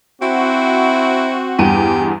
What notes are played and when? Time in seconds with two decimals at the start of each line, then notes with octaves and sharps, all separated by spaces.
0.22 C4 E4 F#4
1.59 E2 G2 G4 D#7